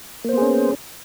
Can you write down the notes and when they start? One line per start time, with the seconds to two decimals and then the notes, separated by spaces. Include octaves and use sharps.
0.24 A#3
0.29 C5
0.33 B3
0.37 G#4
0.42 C#4